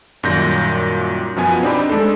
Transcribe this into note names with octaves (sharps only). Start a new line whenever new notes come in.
F#2 A#2 D#3 G3 G6 A#6
F#2 B2 F3 B3 G#5
C4 D4 D#4 G4 B5
G#3 A3 D4 A4